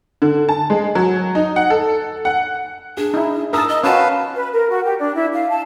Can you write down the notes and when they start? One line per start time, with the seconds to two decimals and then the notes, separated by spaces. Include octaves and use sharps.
0.22 D3
0.49 A5
0.70 G#3
0.95 F#3
1.35 D#4
1.56 F#5
1.70 A4
2.25 F#5
2.97 D4 G#4
3.14 D#4 E4
3.53 A#4 A5 A#5 D#6 E6
3.69 D#5
3.83 C#4 F4 F#4 B4 F5 A5
4.35 B4
4.53 A#4
4.69 F#4
4.84 G4
4.99 D4
5.14 E4
5.33 F5
5.49 A5